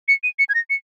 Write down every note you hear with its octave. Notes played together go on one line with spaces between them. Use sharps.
C#7
D#7
C#7
G#6
A#6
C#7